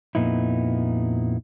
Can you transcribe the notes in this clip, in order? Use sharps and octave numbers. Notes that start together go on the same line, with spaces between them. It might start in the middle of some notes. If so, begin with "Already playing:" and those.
F2 A#2 B3 D#4 E4